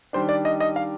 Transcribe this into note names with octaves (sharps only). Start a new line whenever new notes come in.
D#3 G3 D4 C5
D5
D#5
D#5
F5